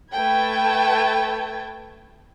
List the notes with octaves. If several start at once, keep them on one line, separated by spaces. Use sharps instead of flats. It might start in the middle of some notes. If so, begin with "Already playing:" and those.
A3 B4 G5 A5 G#6